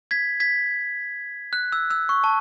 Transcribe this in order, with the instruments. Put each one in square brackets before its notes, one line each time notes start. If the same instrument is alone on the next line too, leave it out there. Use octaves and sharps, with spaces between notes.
[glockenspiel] G#6 B6
G#6 B6
F#6
E6
E6
C#6
A5